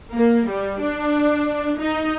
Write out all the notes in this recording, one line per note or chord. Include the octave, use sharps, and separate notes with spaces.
A#3
G3
D4
D#4